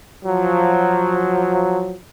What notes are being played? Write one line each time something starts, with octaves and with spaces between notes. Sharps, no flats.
F3 F#3